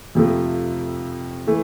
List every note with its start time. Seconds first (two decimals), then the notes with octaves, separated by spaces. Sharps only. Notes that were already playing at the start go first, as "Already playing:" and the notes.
0.15 F2 C3 F3 A3
1.47 E3 A3